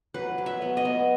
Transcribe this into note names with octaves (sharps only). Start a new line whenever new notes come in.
F#3 B4
F#3
E5
B3
D#5
B3